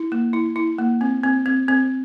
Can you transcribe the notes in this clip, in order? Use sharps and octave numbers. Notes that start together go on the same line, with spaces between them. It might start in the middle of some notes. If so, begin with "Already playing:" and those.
Already playing: E4
A#3
E4
E4
A#3
C4
C4
C4
C4